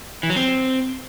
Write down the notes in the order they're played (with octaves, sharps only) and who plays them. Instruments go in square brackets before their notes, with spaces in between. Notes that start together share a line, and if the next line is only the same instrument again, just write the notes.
[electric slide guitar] E3
F#3
C4